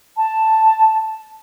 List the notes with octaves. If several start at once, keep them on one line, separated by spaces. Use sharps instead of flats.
A5